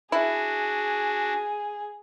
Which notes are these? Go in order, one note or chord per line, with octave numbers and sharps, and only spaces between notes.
D4 E4 F#4 G#4